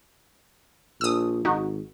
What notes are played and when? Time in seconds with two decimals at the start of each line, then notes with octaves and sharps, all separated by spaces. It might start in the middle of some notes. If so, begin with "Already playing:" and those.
1.01 A#1 D#6 E6
1.45 G#1 D#4 F#4